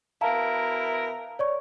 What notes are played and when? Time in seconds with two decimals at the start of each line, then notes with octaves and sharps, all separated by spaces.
0.21 B2 E4 A#4 F5 A5 A#5
1.39 C#5 D5 C#6